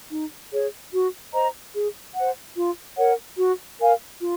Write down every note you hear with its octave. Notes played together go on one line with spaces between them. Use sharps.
D#4
G#4 C#5
F#4
C5 D#5 A#5
G#4
C5 F#5
F4
A#4 C#5 F#5
F#4
A#4 F5 G#5
F4